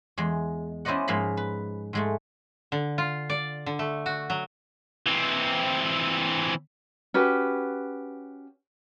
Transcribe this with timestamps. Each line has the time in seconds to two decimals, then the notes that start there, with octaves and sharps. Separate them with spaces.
0.17 E2 G#3
0.85 C#4 E4 C5 D5 D#5 F#5
1.08 G#2 F3 G#3 A#3 F5 B5
1.37 B4
1.93 G#2 G#3 A3
2.72 D3
2.98 F4
3.30 D5
3.66 D3
3.79 A3
4.06 F#4
4.30 F#3
5.07 E3 C4
7.14 C#4 F#4 G4 B4